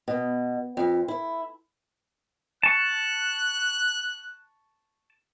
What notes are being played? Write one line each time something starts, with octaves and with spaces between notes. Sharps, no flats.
B2
F2
E4
A5 C#6 F#6